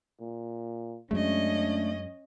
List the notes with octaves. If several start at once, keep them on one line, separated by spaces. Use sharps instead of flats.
A#2
F#2 G#3 A3 C#4 D4 D#5